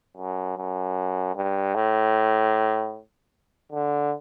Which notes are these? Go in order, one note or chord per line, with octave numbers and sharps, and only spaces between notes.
F#2
F#2
G2
A2
D3